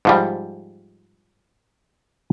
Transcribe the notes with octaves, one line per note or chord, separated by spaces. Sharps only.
G#2 F3 G3